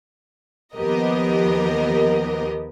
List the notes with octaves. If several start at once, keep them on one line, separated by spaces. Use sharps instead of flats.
D#2 F3 B3 G4 A#4 D#5